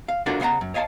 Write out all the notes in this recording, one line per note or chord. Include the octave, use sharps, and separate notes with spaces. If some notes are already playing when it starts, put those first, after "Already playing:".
F5
D4 F4 F#4 A4 A#4 F#5
C#3 B3 F5 F#5 A#5
F#2
C#5 D#5 F5 G#5 A5